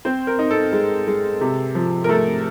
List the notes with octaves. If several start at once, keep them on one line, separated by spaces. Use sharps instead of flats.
C4 C5
A#4
D#4
A4
G#3
G#3
C3
F3
A#4
A3 A4